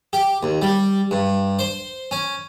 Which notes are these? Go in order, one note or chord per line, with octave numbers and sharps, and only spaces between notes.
G4
D#2
G3
G2
C5
C#4